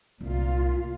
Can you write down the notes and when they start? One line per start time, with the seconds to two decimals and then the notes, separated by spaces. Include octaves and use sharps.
0.21 C2 A#2 D#4 F4